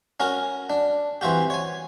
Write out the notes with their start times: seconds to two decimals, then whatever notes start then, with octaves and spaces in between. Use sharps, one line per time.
0.20 C#4 F#4 A#4
0.70 D4
1.21 E3 C4 F#4 G4
1.50 C#5 G#5